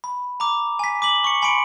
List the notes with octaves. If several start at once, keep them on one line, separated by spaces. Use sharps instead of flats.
B5
A#5 D6
G#5 B6
D6 B6 F#7
C#6 C#7
G#5 B5 C6 C#7 D7